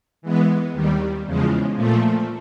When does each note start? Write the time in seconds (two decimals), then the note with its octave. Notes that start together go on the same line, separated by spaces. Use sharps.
0.22 E3 G#3 B3
0.73 D#2 D#3 G3
1.24 E2 C#3 F3 G#3
1.75 A#2 F3 A3